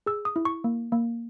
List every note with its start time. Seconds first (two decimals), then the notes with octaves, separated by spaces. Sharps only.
0.06 G#4 E6
0.25 D#6
0.36 E4
0.45 C#6
0.64 A#3
0.92 A#3